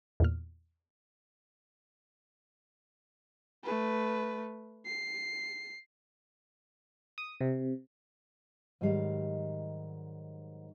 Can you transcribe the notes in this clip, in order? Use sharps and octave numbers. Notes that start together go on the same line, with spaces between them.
E2 A#2 F6
A3 B4
C7
D#6
C3
G#2 D#3 F#3 G3 F5